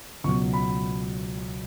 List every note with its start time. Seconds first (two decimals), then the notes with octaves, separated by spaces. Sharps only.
0.24 C#2 B2 F#3 C#6
0.53 B5